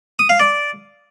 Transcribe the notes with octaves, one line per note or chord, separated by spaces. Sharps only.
D#6
F5
D5